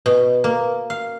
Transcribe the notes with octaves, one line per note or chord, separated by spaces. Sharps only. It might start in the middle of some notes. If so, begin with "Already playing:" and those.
B2
A#3
F5